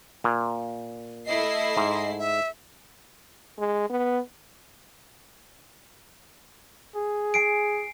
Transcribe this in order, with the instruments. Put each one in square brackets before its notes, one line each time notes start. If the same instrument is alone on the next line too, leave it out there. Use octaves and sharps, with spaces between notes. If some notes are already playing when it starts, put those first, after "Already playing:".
[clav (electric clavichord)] A#2
[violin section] A3 E4 C7 [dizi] D#5
[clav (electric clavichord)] G#2
[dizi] E5
[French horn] G#3
B3
[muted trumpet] G#4
[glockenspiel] G#5 C7 D7